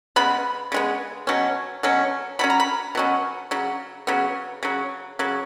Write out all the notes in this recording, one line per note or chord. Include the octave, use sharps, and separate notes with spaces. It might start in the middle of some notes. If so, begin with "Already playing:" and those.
C#3 G#3 B3 B5
C#3 G#3 B3
B2 F#3 C#4
B2 F#3 C#4
B2 F#3 C#4 B5
A#5
B5
B2 F#3 C#4
C#3 F#3
C#3 F#3 B3
C#3 F#3
C#3 F#3